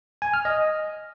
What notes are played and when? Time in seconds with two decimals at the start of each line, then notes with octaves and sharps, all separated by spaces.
0.22 G#5
0.34 F6
0.45 D#5